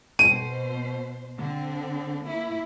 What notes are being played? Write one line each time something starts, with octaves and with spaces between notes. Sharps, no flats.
B2 C5 D#7
D3 C4
A#3 E4